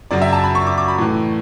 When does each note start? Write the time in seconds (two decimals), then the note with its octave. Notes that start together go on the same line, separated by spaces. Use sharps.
0.11 F#2 C#3 F#3 D5
0.22 E5
0.33 A5
0.44 B5
0.55 C#6
0.66 D6
0.78 D6
0.88 B5
0.98 A2 E3 A3